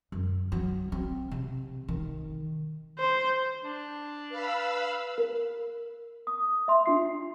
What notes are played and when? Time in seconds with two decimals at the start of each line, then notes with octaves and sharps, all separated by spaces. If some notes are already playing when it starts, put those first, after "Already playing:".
0.12 F#2
0.52 F#3
0.92 C4
1.31 C3
1.88 D#3
2.99 C5
3.63 D4
4.30 B4 F5 B5 E6
5.18 A#4
6.27 D#6
6.68 E5 C6
6.86 D4 F4 C7